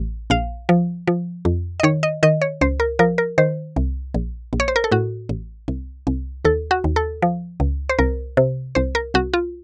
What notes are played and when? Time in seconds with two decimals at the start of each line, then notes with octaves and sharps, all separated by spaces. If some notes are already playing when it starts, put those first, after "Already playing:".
Already playing: A1
0.30 A#1 F5
0.69 F3
1.08 F3
1.45 F2
1.80 D#5
1.83 D#3 C#5
2.03 D#5
2.23 D#3 D#5
2.41 C#5
2.61 C#2 C5
2.80 A#4
2.99 F3 A#4
3.18 A#4
3.38 D#3 C5
3.76 C2
4.14 A#1
4.53 A#1
4.60 C#5
4.68 C5
4.76 A#4
4.84 A4
4.92 A2 F#4
5.29 A1
5.68 C2
6.07 C2
6.45 D#2 A4
6.71 F#4
6.84 D#2
6.96 A4
7.22 F3
7.60 C#2
7.89 C5
7.99 C2 A#4
8.37 C3
8.75 C2 C5
8.95 A#4
9.14 C2 F#4
9.34 F4